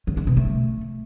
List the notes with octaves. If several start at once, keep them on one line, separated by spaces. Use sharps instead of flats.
D#3
G#3
B2
A3